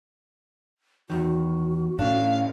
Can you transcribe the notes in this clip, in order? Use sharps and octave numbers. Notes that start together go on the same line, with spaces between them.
E2 D#3 F#4
A2 C#4 D4 F5